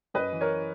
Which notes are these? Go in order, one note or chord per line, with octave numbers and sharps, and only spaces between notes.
F#2 B4 D#5
E3
A#4 C#5